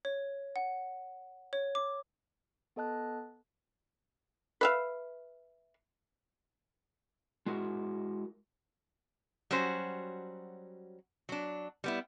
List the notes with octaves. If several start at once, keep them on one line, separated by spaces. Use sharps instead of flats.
C#5
F#5
C#5
D6
B3 A4 D#5 A5 F#6
B4 E5 F5
G#3 E4 F#4 A#4
F#3 G3 C#4 F#4 C5
F#3 D4
G3 B3 E4